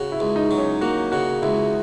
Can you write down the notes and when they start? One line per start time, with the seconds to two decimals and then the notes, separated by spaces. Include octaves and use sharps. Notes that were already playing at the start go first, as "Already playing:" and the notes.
Already playing: C#3 F#4
0.12 E4
0.20 C#2
0.36 D#4
0.51 F#3
0.58 C#4
0.81 A#3 F#4
1.12 C#3 F#4
1.42 C#2 E4